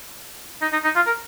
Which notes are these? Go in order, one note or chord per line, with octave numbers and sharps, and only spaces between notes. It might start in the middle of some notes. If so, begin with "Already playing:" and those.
D#4
D#4
D#4
F4
A#4